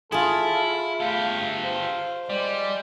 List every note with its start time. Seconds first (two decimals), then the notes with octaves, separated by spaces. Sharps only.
0.12 E4 F4 G#4 A4
1.00 A3 G4 A4 F5
1.64 C5 F5
2.30 G3 G#3 D5